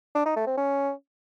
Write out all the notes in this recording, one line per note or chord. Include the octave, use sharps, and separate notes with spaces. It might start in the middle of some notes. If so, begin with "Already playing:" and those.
D4
D#4
A3
C4
C#4